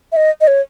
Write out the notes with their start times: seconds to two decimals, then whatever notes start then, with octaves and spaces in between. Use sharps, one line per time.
0.12 E5
0.17 D#5
0.41 D#5
0.47 C#5